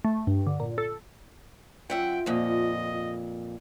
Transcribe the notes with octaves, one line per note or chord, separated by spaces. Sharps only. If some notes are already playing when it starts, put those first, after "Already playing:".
A3
G2
D3
A#2
A4
F#2 F4 E5 F#5 G5
F2 A#2 D#5